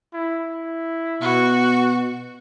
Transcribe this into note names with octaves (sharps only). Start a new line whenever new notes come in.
E4
B2 F#4